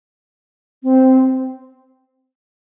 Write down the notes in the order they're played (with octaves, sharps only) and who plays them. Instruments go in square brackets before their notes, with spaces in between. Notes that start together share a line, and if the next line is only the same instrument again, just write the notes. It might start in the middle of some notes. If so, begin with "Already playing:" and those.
[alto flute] C4